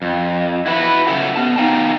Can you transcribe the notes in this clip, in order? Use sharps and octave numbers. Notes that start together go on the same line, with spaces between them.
F2
E4 F#4 B4
C#3 F#3 C#4 A4 E5 F#5
B3 A5
B3 D#4 F5 G5